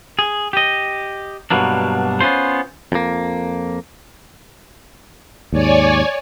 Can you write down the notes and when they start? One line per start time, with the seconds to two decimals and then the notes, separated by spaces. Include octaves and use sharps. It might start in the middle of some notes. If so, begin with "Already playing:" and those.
0.19 G#4
0.53 G4 D#5
1.51 G2 B2 F#3 A#3 D4
2.21 B3 C#4 F4 C5
2.92 F2 A#3
5.53 D#2 G#2 C#5 D5 G#5